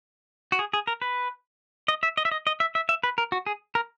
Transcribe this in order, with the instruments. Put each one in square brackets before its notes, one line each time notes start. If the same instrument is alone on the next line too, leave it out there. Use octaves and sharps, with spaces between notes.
[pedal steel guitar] F#4
G#4
G#4
A#4
B4
D#5
E5
D#5
E5
D#5
D#5
E5
E5
E5
B4
A#4
F#4
G#4
A#4